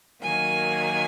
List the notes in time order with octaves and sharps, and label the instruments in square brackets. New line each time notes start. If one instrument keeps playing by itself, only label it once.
[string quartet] D#3 F#3 A#3 G#5